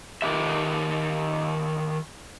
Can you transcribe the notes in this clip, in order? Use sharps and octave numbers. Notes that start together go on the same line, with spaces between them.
D#3 G4 E5